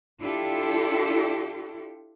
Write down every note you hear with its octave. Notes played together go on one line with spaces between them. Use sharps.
D4 E4 F4 G4 A4